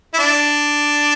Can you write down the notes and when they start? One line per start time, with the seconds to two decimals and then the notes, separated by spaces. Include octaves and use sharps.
0.14 E4
0.19 D4